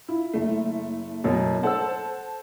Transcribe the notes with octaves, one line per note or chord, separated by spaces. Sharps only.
E4 F4
F#1 A3
F#2 B2 F#3
A4 C5 F#5 A5 E6